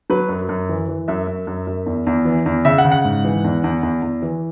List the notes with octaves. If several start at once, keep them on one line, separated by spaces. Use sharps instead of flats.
F#3 B4
F#2
F#2
E3
E3
F#2 E5
F#2
F#2
F#2
E2
E2
E3
E2
C#3 E5
F#5
C#3
F#5
G#2
E3
E2
E2
E2
E2
E3